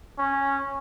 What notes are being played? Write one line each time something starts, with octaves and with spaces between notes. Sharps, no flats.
C#4